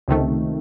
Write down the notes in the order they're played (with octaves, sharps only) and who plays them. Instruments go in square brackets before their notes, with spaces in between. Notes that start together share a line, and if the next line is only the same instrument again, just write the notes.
[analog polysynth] C#2 C3 D#3 A3